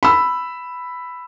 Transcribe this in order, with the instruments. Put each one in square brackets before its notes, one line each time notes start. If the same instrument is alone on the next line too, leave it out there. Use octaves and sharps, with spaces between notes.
[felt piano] B5 E6